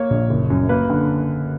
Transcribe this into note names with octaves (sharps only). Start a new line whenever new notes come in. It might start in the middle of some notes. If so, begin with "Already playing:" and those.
Already playing: A#3 C#5
A#1
F#1
F#2
A#3 B4
D3